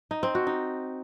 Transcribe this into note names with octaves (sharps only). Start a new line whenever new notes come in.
D#4
C4
F#4
D#4